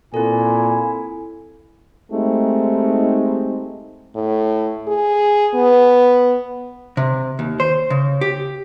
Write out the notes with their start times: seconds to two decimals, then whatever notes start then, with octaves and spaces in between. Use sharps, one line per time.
0.14 A#2 C4 E4 A4 G#5
2.12 G#3 A3 C4 D#4 G4
4.15 A2
4.88 G#4
5.54 B3
6.97 C3
7.39 D#2
7.60 C5
7.90 C#3
8.21 G4